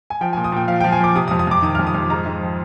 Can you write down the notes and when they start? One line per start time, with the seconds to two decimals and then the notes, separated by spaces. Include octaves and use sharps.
0.10 G#5
0.21 F3 G5
0.33 A#2 G#5
0.44 D#6
0.52 A#2 G5
0.68 F3 F5
0.80 F3 G5
0.92 G#5
1.00 F3 D6
1.15 C3 D#6
1.28 D#6
1.31 F2
1.39 D#6
1.47 F2 D6
1.62 D#3 D#6
1.75 F2 F6
1.87 D#6
1.95 F2
2.10 G#2 A#5
2.26 G#2
2.41 F3